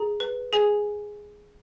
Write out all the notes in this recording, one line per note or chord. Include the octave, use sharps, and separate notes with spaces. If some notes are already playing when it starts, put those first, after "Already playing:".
Already playing: G#4 A#5
B4
G#4 G#5